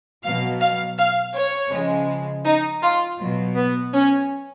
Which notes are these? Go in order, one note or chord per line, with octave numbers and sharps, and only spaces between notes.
B2 F#3 F5
F5
F5
C#5
C#3 F3 G#3
D#4
F4
B2 F#3
B3
C#4